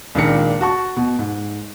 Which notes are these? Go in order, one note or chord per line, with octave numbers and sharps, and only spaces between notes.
C#2 A#2 D#3 D4 A#4 C#7
F#4 A5 C#6
B2
G#2